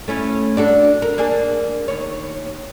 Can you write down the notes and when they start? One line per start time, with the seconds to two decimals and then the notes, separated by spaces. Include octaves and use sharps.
0.08 A3 C#4 E4
0.57 D4 F#4 A4
1.02 A#4
1.18 A#3 D4 G#4
1.88 D#2 C#5